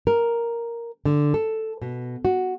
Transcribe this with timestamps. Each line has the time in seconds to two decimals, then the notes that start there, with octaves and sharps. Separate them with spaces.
0.07 A#4
1.05 D3
1.34 A4
1.82 B2
2.25 F#4